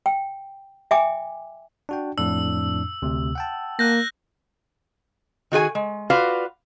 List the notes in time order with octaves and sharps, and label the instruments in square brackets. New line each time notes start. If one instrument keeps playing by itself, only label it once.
[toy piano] G5
E5 G5 G#5 D6
[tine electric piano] D4 F#4 G5
[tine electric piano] F2 A2 D4 [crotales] E6
[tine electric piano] D2 C3
F#5 G5 A5
[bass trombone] A#3 [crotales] F#6 G6 A#6
[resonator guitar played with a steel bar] D#3 F#4 G#4 G#5
G#3
F4 F#4 B4 D5 F5